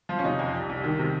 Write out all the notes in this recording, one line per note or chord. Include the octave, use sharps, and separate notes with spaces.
F3 F4
C#4
C3 D#4
F2
C2
C2
D#3
C3